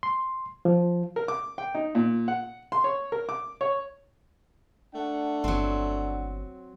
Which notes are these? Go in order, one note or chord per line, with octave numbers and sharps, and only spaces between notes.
C6
F3
A#4
D6
G5
D#4
A#2
F#5
C6
C#5
A#4
D6
C#5
A3 D4 F#5
G1 F#3 C4